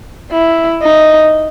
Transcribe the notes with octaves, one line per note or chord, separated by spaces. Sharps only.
E4
D#4